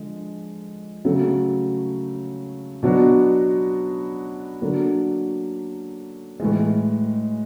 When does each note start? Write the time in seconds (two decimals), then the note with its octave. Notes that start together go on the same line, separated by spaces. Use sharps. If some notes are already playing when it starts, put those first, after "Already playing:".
Already playing: D3 F3 G#3
1.05 C#3 F#3 A3
2.83 B2 F#3 B3 D4
4.61 D3 F#3 A#3 D4
6.40 A2 E3 G#3